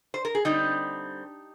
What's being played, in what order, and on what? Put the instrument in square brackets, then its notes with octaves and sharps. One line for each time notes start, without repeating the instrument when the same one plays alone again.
[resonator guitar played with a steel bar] C5
A#4
G#4
D3 G3 C4 D#4 G4